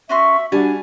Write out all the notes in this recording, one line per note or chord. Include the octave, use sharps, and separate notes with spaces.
C#4 F#4 E5 C6
G3 D4 F#4 G#5 A5